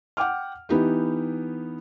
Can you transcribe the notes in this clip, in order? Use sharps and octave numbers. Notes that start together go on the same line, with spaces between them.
F#5 G5 D6 F6
E3 B3 D#4 G4